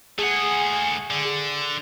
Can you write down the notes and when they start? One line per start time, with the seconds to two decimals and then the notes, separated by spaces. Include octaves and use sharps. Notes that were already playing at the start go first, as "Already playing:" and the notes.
0.19 A3 G#4 F#5
1.10 D3